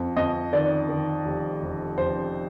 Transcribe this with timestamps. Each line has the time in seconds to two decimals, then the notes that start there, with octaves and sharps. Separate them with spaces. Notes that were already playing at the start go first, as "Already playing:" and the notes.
Already playing: F2
0.17 F2 D#5
0.53 D#3 D5
0.89 D#3
1.25 F1
1.62 F1
1.98 F1 C5